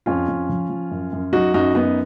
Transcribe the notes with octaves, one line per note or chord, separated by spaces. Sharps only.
F2 C#4 F4
F2
F3
F3
F#2
F#2
F#3 D#4 F#4
F#2 D#4 F#4
F#2 B3 D#4